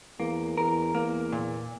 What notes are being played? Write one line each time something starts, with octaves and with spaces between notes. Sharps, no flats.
E2 A#3
E2 A#4
E2 A#3
A#2